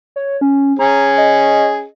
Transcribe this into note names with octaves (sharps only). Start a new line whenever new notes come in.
C#5
C#4
C#4 G#4 A#5
D#5